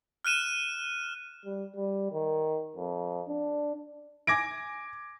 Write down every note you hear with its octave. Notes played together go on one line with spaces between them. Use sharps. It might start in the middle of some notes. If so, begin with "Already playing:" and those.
F6 F#6 D#7 E7
G3
G3
D#3
F2
D4
G#5 D6 G#6 A#6 D7